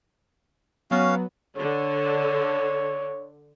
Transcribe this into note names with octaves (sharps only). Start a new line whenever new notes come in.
F#3 B3 C#4 F#4 F5
D3 C#5